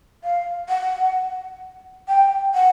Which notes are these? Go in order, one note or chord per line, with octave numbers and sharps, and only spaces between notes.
F5
F#5
G5
F#5